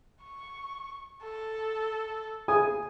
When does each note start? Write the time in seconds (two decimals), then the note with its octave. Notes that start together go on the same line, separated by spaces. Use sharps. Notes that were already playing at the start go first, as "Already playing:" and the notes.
0.23 C#6
1.23 A4
2.48 G#4 G#5 D#6